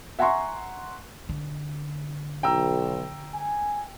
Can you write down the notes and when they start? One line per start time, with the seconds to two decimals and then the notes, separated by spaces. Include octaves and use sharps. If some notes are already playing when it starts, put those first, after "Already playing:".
0.19 E5 F#5 G#5 A#5 C6 C#6
1.29 D3
2.43 B1 G5 A#5 E6
3.34 G#5